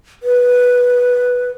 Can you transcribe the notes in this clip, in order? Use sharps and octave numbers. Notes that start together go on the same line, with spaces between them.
B4